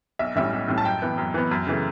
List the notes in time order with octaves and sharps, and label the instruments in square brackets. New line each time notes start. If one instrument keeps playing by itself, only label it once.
[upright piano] B1 E5
A2 G3 C#4 E5
B1
A2 G3 C#4
A5
F#2 G5
E3 B3
F#2
E3 B3
F#2
C#3 E3 A3